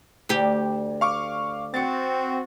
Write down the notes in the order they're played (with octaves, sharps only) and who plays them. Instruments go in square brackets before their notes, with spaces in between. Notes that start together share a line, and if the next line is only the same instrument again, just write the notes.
[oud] D2 G4
[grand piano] F5 C#6 D6
[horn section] C4 F#4 [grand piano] A6 C#7